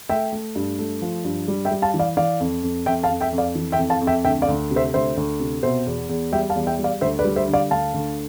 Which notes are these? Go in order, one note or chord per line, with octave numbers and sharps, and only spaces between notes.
A3 E5 G5
A3
G2
A3
F3
G2
G3
E5 G5
G3
F5 A5
E3
D5 F5
E3 D5 F5
F2
F2
F2 E5 G5
F5 A5
F2
E5 G5
F2
D5 F5
E3
E5 G5
F2
F5 A5
F2
E5 G5
D2 E5 G5
D5 F5
D2
C3
C5 E5
D2 C5 E5
D2
C3
B2 C5 E5
E2
E2
G3 E5 G5
F5 A5
E2
E5 G5
G3
D5 F5
D2 C5 E5
B4 D5
G3
C5 E5
D3
D5 F5
D2 F5 A5
D2